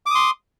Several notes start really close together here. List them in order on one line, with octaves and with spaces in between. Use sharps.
D6 D#6 C6